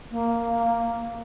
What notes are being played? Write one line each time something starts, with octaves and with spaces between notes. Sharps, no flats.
A#3